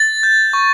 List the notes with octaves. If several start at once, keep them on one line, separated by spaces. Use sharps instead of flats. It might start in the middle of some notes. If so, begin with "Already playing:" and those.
Already playing: A6
G6
C#6